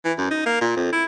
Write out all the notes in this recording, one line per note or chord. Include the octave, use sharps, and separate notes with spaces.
E3
F#2
D#4
A#3
A#2
F2
E4